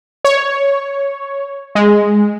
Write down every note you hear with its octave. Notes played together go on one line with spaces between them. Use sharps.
C#5
G#3